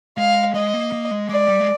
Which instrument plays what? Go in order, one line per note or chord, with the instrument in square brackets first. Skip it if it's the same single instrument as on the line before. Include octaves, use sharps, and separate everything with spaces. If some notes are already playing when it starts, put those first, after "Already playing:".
[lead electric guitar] G#3 [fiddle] F5
[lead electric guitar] G#3 [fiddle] D#5
[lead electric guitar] A#3
A#3
G#3
[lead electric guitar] G#3 [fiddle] D5
[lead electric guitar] G3
G#3